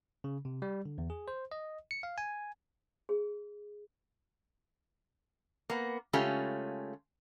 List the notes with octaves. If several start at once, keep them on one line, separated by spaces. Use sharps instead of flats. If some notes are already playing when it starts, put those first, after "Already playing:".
C#3
C3
G3
D3
E2
G#4
C5
D#5
C#7
F5
G#5
G#4
A#3 B3
C#3 G#3 A3 C#4 F4 G4